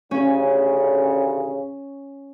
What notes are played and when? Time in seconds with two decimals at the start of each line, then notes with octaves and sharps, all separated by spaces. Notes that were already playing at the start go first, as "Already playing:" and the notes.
0.11 A1 D2 C#3 C#4